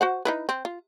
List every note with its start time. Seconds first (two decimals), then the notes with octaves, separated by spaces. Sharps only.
0.01 F#4 C5 F#5
0.25 D#4 E4 B4
0.49 C4
0.65 F4